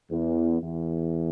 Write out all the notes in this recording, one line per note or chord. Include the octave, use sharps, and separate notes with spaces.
E2
E2